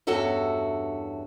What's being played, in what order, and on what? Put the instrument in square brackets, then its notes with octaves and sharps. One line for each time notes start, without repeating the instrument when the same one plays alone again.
[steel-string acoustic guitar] E2 G2 C#4 F#4 A4 E5